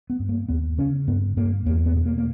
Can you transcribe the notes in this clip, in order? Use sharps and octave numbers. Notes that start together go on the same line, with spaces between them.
B3
G2
A#3
D#2 B3
C#3 C#4
G2 B3
G2 A#3
E2 A#3
B3
B2
A#3
A#3